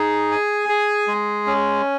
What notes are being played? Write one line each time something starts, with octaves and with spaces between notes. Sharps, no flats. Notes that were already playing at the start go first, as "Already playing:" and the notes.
Already playing: D#4 G#4
G#5
G#4
G#3
C#4